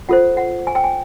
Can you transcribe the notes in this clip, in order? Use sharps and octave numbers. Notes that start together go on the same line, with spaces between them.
F4 A4 C5 F#5
F#5
G#5
G5
G#5